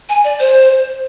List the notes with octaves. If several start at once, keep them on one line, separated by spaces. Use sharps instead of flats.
G#5
D5
C5